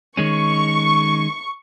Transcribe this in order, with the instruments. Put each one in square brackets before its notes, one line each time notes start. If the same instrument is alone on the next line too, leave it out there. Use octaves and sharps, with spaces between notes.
[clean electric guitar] D#3 G#3 C#4 [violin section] C#6